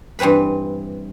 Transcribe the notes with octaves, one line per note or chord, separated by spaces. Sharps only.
G2 E3 C4 B4 B5